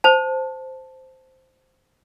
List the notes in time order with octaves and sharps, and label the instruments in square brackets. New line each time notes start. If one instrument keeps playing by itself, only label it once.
[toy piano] C5 A5